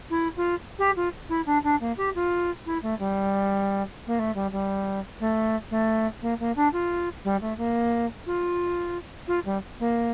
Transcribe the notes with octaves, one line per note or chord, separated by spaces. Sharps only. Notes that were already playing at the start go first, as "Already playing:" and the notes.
E4
F4
G4
F4
E4
D4
D4
A#3
G4
F4
E4
A3
G3
A#3
A3
G3
G3
A3
A3
A#3
A#3
D4
F4
G3
A3
A#3
F4
F4
G3
A#3